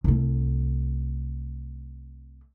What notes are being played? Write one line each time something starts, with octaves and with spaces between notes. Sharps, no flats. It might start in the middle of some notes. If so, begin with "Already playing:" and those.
C2 A3